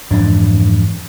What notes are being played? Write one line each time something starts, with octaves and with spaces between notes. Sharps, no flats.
F2 G#2 E3 D4